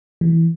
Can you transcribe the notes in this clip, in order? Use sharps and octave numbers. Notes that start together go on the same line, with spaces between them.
E3